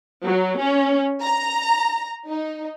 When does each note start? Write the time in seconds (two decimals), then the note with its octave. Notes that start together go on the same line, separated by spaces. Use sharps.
0.24 F#3
0.59 C#4
1.22 A#5
2.27 D#4